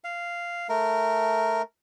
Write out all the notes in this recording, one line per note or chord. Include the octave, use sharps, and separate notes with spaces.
F5
A3 A#4